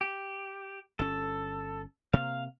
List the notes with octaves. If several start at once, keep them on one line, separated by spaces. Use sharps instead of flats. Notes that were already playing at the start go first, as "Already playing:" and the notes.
G4
G1 C#4 A4
C3 A#3 F5